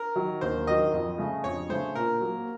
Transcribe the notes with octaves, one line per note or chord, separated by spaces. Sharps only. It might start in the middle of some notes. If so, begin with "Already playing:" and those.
Already playing: A#4
D#3 F#3
D#2 C5
D#3 F#3 D#5
F2
C#3 A3
F2 C#5
C#3 A3 C5
A#2 A#4
F#3 A#3